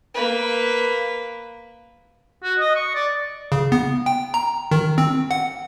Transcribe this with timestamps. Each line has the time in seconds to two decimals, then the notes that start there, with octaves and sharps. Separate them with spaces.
0.14 A#3 B4
2.43 F#4
2.59 D#5
2.75 C#6
2.95 D5
3.52 C#3
3.72 B3
4.06 G5
4.34 A#5
4.71 D#3
4.98 C4
5.31 F#5